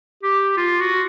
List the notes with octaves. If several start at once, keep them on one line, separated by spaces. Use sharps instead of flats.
G4
F4
F#4